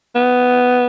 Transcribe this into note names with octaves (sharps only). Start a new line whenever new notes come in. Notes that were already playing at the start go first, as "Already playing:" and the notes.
B3